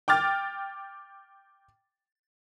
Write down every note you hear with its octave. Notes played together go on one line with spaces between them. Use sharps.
G5 D6 F6 A6